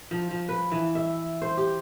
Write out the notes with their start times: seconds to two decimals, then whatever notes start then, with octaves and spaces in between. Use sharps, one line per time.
0.11 F3
0.31 F3
0.49 B4
0.72 E3
0.95 E5
1.42 C5
1.57 G4